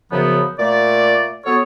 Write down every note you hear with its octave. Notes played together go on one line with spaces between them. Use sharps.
F#2 C#3 F3 F#3 B3
A#2 A3 D5
F#3 B3 A4 C#5